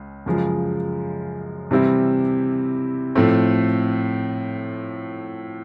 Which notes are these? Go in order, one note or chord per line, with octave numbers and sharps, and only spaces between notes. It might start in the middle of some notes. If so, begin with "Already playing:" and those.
Already playing: C#2 C#3
F#2 C#3 F3 G#3
C3 E3 G3 C4 E4
A2 F3 A3 C4